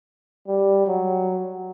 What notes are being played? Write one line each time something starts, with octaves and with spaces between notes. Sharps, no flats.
G3
F#3